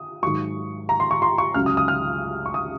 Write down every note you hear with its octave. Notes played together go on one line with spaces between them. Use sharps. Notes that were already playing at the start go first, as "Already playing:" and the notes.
Already playing: D#6
G#2 D#3 F#3 C#6
A#5
C6
C#6
C6
C#6
C#2 C#3 F#3 F6
D#6
D#6
F6
C#6
D#6